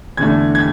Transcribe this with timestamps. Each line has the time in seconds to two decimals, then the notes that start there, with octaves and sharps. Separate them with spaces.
0.17 E2 D3 A3 G#6
0.55 G#6